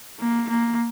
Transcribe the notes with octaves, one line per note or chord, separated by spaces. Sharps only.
A#3
A#3